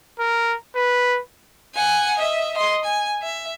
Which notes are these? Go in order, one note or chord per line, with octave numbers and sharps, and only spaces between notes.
A#4
B4
F#5 G#5
D#5 E5
D#5 C6
G#5
E5